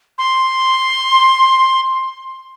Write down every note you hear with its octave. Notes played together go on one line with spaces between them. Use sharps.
C6